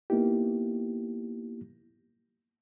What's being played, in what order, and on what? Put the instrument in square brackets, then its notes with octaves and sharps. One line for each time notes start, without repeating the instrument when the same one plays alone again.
[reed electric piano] A#3 B3 D#4 E4 G4